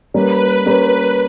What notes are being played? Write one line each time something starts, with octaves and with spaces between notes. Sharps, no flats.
G3 A#3 C#4 B4
G3 A#3 C#4 B4